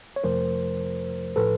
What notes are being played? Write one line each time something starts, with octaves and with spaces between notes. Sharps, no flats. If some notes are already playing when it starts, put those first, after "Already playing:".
C#5
F2 C3 F3 A3 A#4 C5
A2 F3 A4 B4